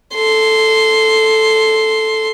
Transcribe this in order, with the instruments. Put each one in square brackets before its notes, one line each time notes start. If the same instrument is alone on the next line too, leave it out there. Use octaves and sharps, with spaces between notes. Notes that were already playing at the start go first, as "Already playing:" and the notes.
[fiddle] A4 C6